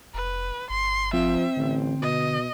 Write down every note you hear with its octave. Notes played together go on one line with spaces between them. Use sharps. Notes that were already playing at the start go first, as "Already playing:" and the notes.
F1 B4
G1 C6
F3 C4 E5
A1 D3
B2 D#5